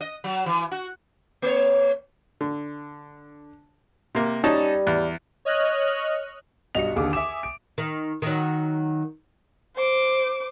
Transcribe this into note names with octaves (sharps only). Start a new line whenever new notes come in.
D#5
F#3
E3
F#4
A#3 C#5
D3
C3 A#3
G3 C#4 D#4 A5
E2
C#5 D#5 F6 F#6
B1 G2 F#4 D#5 C#7 F7
D#2 D3 G#4 D6 D#6
E5 G#5 D6 D#6 E7
D7
D#3
D#3 F#3
C5 D6